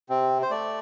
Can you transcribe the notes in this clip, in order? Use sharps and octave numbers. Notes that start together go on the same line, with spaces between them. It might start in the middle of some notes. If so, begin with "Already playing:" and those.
C3 C4
C5
A3 D5